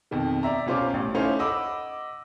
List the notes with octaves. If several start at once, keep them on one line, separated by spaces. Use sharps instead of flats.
F2 B2 D#3
D5 E5 A#5
C2 B2 C#4 F4 C5 D6
A1
A3 C#4 D#4 E4 C5 F5
D#5 F#5 B5 D6 E6